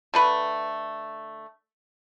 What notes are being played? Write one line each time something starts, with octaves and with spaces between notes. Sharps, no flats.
D3 A3 B4